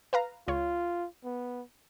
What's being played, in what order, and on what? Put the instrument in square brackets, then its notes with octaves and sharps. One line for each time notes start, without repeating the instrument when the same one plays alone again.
[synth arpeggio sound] B4 F5 A#5
[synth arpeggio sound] C#2 C#5 [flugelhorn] F4
[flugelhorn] B3